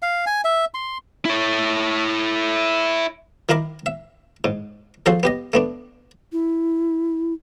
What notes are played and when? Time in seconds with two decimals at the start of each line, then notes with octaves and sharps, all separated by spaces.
0.02 F5
0.26 G#5
0.44 E5
0.74 C6
1.25 E4 C#5
3.49 D#3 D#4 E4 A#4 B5 D6
3.86 E5
4.44 G#2
5.06 F3 F#4 G#4 A4 C5
5.23 B3 G4 D#5
5.53 A3 B3 D4
6.32 E4